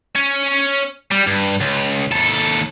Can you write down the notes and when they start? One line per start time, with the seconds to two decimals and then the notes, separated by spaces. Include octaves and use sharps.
0.16 C#4
1.11 G3
1.27 G2
1.60 C#2
2.11 D#2 A4